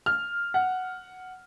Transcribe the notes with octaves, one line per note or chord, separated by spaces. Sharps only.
F6
F#5